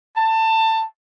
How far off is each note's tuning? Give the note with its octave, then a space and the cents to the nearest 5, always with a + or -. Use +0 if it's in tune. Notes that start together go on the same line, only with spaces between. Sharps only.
A5 +20